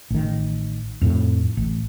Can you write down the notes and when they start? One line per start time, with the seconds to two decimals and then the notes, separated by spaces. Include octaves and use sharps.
0.10 A1 D#3
1.01 F2 A2
1.57 A1